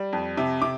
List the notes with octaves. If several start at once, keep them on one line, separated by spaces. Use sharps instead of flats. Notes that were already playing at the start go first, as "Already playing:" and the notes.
Already playing: G3
F2
C3
C3 D6